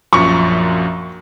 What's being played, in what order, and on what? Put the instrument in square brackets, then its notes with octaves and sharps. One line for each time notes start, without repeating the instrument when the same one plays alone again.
[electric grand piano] A#1 F#2 F3 [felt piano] C#6